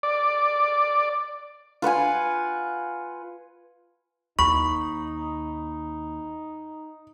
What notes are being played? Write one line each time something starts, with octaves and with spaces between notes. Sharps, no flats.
D5
F4 B4 F#5 G#5
D#2 D#4 B5 C#6